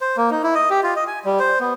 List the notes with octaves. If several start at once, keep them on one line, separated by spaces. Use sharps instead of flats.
C5
A#3
D#4
E4
D#5
G4
F4
D#5
G#5
G3
C5
B3